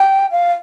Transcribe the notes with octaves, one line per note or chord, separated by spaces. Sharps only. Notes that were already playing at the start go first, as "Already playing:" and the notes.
Already playing: G5
F5